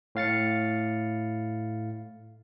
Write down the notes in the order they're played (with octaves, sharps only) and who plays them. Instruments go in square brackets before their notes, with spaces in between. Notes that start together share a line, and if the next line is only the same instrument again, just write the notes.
[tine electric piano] A2 F5 A6 C#7